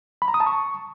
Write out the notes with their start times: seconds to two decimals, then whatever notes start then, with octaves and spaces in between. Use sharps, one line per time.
0.22 B5
0.28 A#5
0.34 D#6
0.40 A5
0.47 C#6